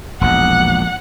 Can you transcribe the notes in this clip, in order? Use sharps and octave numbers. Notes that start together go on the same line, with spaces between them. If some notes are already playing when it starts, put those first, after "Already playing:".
E1 A#1 F#5